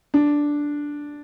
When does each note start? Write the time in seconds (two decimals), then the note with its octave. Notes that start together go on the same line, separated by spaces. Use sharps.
0.14 D4